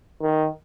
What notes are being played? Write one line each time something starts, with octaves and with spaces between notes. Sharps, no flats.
D#3